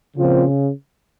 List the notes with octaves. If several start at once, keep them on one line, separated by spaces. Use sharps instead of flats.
A#2 C#3 F3 C4 F4